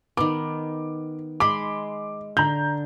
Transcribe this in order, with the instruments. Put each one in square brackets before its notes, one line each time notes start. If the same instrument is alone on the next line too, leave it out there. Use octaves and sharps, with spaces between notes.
[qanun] D#3 B3 [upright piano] D6
[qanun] G#3 B5 C6 [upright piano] D6
[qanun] D3 [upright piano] A#5 G6